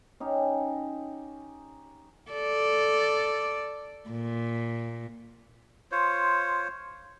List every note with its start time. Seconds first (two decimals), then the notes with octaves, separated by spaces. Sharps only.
0.20 C#4 D#4 G4
2.31 A4 D5
4.09 A#2
5.92 F4 C5 C#5